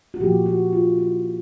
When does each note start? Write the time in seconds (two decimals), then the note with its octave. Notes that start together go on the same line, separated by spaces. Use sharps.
0.14 F#4
0.20 A#2 F3 A#3 G4
0.46 F#4
0.73 F4
0.98 E4